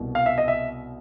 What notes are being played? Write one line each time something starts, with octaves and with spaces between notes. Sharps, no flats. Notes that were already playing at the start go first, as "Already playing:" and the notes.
Already playing: C2 B2
F5
E5
D#5
E5